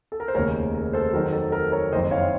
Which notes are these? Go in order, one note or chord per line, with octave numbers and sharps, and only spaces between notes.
A4
A#4
C5
F1 D#2 C#3 A#4 C#5
A#4
A4 C5
F2 D#3 F#3 A#4
A4
A#4
A#4 C#5
F#1 F2 D#3 C5 D#5
C#5 F5